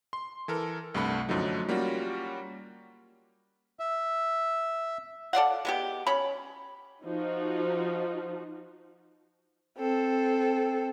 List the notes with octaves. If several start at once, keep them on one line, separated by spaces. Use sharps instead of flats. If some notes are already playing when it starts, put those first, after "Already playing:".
C6
E3 A4 A#4
C2 G2 A3 F#5 B5
F#2 D3 F3 F#3 A3 D#4
G3 A#3 C#4 F4 F#4
E5
A4 D5 F5 F#5
G#3 B3 G4
C#4 B5
F3 D#4 F#4
C4 A4